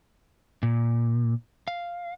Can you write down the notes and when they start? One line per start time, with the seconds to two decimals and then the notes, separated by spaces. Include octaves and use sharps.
0.63 A#2
1.68 F5